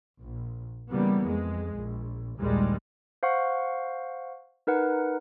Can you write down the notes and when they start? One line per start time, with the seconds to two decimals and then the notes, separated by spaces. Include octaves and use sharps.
0.20 A#1
0.90 C#3 E3 G3 A#3 B3
1.26 F2 G#3
1.75 A#1
2.38 A#1 D#2 G3 G#3
3.23 C5 F5 F#5 C#6
4.67 D#4 A#4 B4 F#5